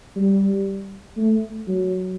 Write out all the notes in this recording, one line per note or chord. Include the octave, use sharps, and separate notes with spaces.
G3
A3
F#3